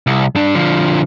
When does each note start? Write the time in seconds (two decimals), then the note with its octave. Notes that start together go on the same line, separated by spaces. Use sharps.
0.07 C2
0.35 G2 D4
0.55 D3 F3